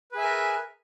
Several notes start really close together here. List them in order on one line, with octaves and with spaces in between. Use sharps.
B4 G#4 E5 G#5 A#4